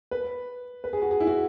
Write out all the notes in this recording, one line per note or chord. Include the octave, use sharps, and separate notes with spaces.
B4
B4
G#4
F#4
G#4
E4
F#4